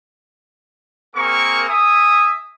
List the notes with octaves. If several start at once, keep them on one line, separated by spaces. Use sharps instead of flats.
A#3 C4 G#4 A#4 C#6
E5 G#5 D#6